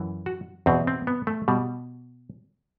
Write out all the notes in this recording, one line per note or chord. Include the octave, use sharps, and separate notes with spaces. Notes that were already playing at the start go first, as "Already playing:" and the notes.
Already playing: F#2 E3
F#4
E2 B2 C4
C4
B3
A3
B2 G3